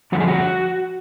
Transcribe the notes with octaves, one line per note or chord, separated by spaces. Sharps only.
F2 D3 F3 F#4
G#4
F#4